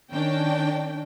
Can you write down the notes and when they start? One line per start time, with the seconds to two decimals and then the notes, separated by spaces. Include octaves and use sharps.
0.11 D#3 C#4 D4 G5